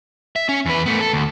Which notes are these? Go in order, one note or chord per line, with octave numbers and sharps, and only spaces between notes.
E5
C#4
E2 B4
A3 B3
A4
D2